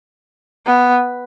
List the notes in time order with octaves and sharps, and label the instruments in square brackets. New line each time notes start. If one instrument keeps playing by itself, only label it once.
[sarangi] B3